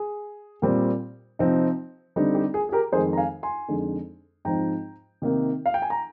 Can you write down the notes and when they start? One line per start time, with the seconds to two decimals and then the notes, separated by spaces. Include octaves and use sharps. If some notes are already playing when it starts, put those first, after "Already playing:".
Already playing: G#4
0.62 A#2 G3 C4
1.39 C3 F3 C4 D#4
2.16 D3 G3 C4 D#4
2.35 G4
2.54 G#4
2.69 G#4
2.72 G4 A#4
2.92 F2 D#3 G#3 G#4 C5
3.13 A#5
3.17 F5 G#5
3.43 G#5 C6
3.68 F2 D3 G#3 D#4
4.45 G#2 F3 C4 D#4 G5 A#5
5.22 C3 D#3 A#3 D#4
5.66 F5
5.74 G5
5.82 G#5
5.90 A#5